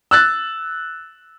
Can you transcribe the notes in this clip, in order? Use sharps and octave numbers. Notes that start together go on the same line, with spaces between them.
E6 F#6 A6